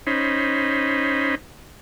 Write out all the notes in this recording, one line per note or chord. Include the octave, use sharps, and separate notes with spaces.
C#4 D#4 C5 B5